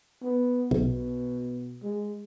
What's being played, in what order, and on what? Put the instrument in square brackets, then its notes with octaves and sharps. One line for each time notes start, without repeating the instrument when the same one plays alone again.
[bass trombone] B3
[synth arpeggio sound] B1 [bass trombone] B2
[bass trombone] G#3